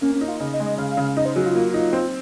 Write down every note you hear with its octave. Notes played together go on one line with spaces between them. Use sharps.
A#3 C#4
C#4
D#4
F4
C#3 D#5
D#5
G#3
D#5
C#3 F5
F5
C#3
F5
D#4 D#5
C5
F#3 G#4
F4
A#3
D#4
C4